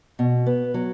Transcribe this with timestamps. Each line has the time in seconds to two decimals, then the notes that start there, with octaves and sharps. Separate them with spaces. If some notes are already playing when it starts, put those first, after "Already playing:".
0.19 B2
0.46 B3
0.74 F#3